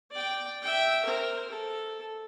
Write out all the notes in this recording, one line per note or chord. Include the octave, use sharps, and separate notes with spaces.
D5 G5
E5 G5
A#4 C5
A4